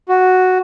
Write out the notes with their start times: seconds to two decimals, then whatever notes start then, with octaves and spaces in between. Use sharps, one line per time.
0.09 F#4